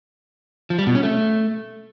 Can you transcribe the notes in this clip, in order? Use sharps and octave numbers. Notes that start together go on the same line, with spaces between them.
F3
G3
B2
C#4
A3